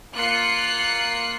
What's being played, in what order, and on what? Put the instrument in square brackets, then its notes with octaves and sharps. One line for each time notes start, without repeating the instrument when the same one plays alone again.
[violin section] A#3 F4 F#6 C7 C#7